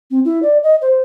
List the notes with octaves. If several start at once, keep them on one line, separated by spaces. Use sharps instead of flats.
C4
E4
D5
D#5
C5